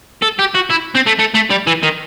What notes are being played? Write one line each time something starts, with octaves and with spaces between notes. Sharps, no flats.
A4
G4
F#4
E4
C4
A3
A3
A3
G3
E3
D#3